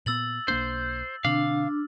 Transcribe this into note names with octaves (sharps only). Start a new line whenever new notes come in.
A#2 B3 E6 A6 F#7
B1 A#3 D4 C5
B2 D3 C4 D4 F5 F6